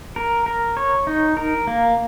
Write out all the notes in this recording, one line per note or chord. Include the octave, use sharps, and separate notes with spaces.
A#4
A#4
C#5
D#4
A#4
A#3